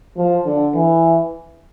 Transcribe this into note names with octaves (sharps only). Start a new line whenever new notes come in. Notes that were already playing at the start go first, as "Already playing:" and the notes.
F3
D3
E3